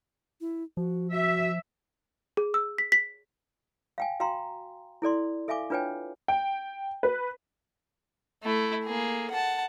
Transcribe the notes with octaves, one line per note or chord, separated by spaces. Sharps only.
E4
F3 F#4
F#4 E5
G#4
E6
B6
B6
F5 G5 G#5
F#4 F5 G5 A#5 C6
E4 A4 D5 C6
A4 E5 F5 G#5 D6
D4 F4 B4 C#5 G5 G#5
G5
B4
A3 E4
A#3 G#4
F#5 A5